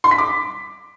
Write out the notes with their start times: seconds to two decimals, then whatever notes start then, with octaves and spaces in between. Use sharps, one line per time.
0.04 C6
0.11 B6
0.18 D6